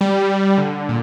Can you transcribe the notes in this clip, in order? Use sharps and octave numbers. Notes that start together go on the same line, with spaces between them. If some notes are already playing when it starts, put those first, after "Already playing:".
G3
D3
A#2